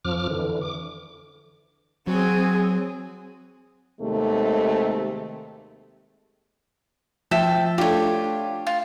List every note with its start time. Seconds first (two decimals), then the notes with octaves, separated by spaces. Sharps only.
0.05 F2 F3 D6 F6
0.30 D3 E3
0.61 D6
2.07 F#3 C4 G#4
4.01 D#2 C3 G#3 A3
7.31 F3 E5 G5 A5
7.78 A3 D4 F4 G4 C#5
8.67 F4